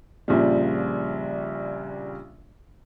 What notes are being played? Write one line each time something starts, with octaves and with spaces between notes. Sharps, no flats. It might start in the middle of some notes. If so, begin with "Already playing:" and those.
A#1 A#2 C#3 F3 G3